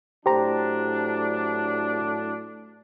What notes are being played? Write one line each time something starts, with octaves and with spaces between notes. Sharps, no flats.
A2 F#3 D4 G4 C5 A#5